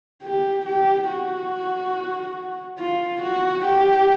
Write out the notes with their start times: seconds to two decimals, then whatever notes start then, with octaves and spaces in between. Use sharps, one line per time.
0.23 G4
0.66 G4
1.09 F#4
2.79 F4
3.22 F#4
3.65 G4